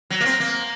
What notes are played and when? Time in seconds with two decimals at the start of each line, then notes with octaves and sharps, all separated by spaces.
0.10 F#3
0.21 A#3
0.25 C4
0.40 A#3